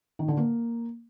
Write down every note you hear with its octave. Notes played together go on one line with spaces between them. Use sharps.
D#3
D3
A#3